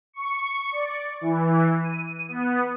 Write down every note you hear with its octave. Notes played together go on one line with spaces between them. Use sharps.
C#6
D5
E3
D#7
B3